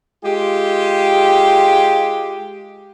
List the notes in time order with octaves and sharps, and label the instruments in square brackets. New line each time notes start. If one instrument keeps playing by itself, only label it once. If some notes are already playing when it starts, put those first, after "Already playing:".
[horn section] G#3 F4 G4